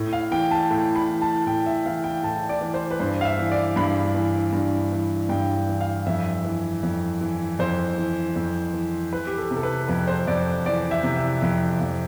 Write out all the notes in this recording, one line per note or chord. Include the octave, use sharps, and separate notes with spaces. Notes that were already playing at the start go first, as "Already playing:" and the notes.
Already playing: A2
F5
E3 G5
A5
A2
B5
E3
A5
A2 G5
E5
E3 F5
G5
A2 A5
D5
E3
C5
B4
G2 C5
F5
E5
E3
D5
G2 B5
E3
G2
E3
G2 G5
E3
F5
F2 E5
E3
F2
E3
F2 C5
E3
F2
E3
E3 B4
G4
A4
C3
A4
B4
F2 B4
C5
F2 D5
E3 D5
E5
C3
E5
F2
F2